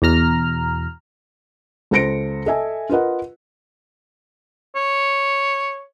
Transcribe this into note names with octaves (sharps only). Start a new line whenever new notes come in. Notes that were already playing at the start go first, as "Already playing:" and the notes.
E2 B2 A#5 F6
C#2 A4 C5 A#6 C#7 D7
A4 D#5 E5 G#5 A5
F4 A#4 B4 D#5 F#5
C#5